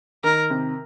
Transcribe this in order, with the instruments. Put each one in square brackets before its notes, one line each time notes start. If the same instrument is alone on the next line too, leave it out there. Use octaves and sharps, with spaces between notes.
[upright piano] D#3 [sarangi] A#4
[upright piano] C3